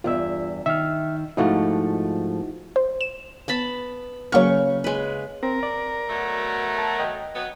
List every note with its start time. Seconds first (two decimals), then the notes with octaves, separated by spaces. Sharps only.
0.04 E2 G2 F4 E5 E6
0.66 D#3 E5 F6
1.37 G#2 F3 A3 D#4 E4 F#4
2.76 C5
3.01 E7
3.48 B3 A5 B5
4.32 C#3 F#3 A#3 C#6 F6
4.84 G#3 B4
5.43 C4 A#4
5.63 D5
6.09 B2 F#3 A3
6.78 A5
6.99 D#5 G5
7.35 F#3 B3